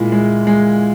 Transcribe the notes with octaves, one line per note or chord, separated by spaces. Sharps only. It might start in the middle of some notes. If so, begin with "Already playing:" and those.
Already playing: A#2 G#3 E4
G#3
G#3